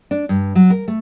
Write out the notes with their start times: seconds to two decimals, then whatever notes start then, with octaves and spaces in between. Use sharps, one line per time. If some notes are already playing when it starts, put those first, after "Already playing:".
0.11 D4
0.29 G2
0.55 F#3
0.70 A#4
0.88 A3